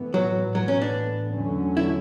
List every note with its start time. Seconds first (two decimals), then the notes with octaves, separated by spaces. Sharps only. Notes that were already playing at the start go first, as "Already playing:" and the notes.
Already playing: A2 E3 B3
0.14 F#3
0.55 A2 E3 F#3 B3
0.68 C#4
0.82 D4
1.36 E2 D3 F#3 A3 C#4
1.77 E4